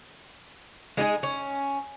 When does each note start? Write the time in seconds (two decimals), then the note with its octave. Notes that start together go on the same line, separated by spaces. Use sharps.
0.97 G#3 D#4 G4 G#4
1.23 C#4